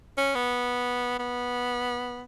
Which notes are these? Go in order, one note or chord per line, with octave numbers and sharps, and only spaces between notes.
C#4
B3
B3